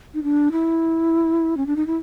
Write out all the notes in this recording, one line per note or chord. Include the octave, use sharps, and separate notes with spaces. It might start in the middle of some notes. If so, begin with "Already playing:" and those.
D#4
D4
E4
C#4
D4
D#4
E4